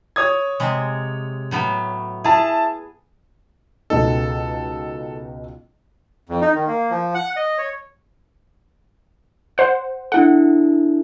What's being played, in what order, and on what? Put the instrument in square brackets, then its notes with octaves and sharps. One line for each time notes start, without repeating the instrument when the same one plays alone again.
[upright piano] C#5 D#6 G#6
[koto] C3 G#3
A2 F#3 B3
[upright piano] E4 A5 [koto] G#4
[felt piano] C#2 B2 D#4 [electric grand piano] A4
[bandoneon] F2
D#4
D#3
A#3
F3
F#5
D#5
C#5
[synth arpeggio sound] C5 F#5
[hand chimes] D4 E4 A4 [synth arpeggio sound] F#5